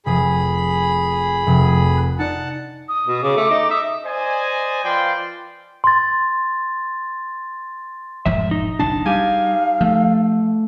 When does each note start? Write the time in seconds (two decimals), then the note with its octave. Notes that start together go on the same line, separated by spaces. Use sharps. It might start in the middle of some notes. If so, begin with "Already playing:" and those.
0.06 F1 F3 G#4 B5 D#7
1.47 F1
1.97 F#6
2.19 D#4 D5 F#5 A5
2.88 D#6
3.07 B2
3.23 C#3 D6
3.37 A3
3.50 D#4
3.70 E5 D#6
4.06 C5 D5 D#5 G#5
4.85 F3 F4 B4 D5 G5 C6
5.84 C6 A6
8.26 E1 G#2 F3 E5
8.51 D#4
8.79 F#1 B1 D4 A5
9.06 G3 G4 F5 G#5
9.81 F3 A3